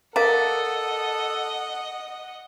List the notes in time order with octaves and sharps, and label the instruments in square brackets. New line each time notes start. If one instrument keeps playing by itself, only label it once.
[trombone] A4 [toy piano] A#4 F5 A#5 [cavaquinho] D5 [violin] D#5 F#5